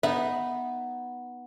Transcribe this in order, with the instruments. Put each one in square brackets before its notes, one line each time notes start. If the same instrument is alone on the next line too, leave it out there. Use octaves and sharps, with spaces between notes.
[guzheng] B3 D#4 [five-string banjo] E5